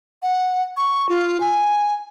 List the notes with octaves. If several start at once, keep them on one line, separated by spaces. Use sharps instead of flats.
F#5
C#6
F4
G#5